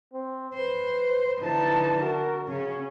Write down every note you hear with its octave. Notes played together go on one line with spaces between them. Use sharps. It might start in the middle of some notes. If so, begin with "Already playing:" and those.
C4
B4 C5
D3 E3 D#4 A5
F#4 A#4
C#3 C#4